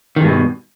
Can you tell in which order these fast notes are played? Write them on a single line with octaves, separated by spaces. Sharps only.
D#3 E2 G2 B2